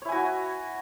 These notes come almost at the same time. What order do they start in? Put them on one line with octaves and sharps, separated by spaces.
C#5 E4 G#5 F#4